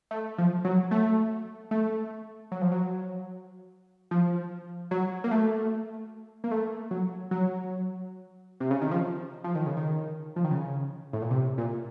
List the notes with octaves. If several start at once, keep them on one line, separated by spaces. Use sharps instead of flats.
A3
F3
F#3
A3
A3
F#3
F3
F#3
F3
F#3
A#3
A3
A#3
A3
F#3
F#3
C3
C#3
D#3
F3
F3
D#3
C#3
D#3
F3
D#3
C#3
A2
A#2
C3
A#2